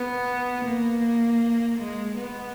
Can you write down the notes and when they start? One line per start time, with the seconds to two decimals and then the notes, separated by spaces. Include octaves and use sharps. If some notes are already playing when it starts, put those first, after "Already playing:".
Already playing: B3
0.64 A#3
1.78 G#3
2.17 B3